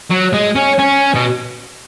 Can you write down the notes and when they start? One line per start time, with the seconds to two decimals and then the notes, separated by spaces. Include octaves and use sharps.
0.11 F#3
0.34 G#3
0.56 C#4
0.79 C#4
1.15 B2